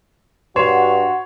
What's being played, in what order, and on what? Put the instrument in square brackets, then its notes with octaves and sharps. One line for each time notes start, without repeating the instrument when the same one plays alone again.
[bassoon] G2 [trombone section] F#4 [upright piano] C#5 [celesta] C6 C7 E7